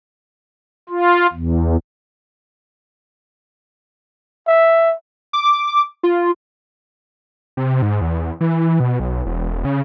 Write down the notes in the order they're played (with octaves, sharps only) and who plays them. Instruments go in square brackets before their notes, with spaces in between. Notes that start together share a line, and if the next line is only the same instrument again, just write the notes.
[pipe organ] F4
E2
[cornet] E5
[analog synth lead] D6
F4
[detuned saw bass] C3
G#2
E2
E3
B2
B1
E1
C#3